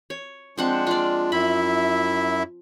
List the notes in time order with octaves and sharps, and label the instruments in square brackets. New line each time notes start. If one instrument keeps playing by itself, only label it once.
[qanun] C#5
[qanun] F3 C4 F#5 [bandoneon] G#3 D4
[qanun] F4 D5
[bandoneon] F#2 E4 E5 [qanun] B5